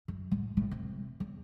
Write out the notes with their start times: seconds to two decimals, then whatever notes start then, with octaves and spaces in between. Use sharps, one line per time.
0.08 F#2
0.31 A2
0.57 A2
0.71 C3
1.20 E2